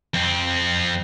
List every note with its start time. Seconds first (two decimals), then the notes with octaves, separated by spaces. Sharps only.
0.14 F2 C4